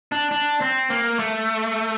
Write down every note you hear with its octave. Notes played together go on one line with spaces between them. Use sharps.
D4
D4
C4
A#3
A3